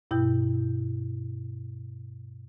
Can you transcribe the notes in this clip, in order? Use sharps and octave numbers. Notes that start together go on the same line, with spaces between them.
G2 B2 E4 G5 G6